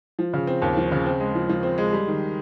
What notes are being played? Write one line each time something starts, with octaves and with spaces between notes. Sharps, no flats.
F3
C#3
C4
D#2
F3
C#3
C4
G#3
F3
F3
C4
G#3
G3
D#3